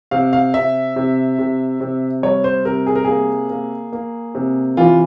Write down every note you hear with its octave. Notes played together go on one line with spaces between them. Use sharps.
C3 F5
F5
C3 E5
C3
C3
C3
G3 C#5
C5
C3 A#4
G#4
A#4
A#3 G#4
A#3
A#3
C3
E3 F4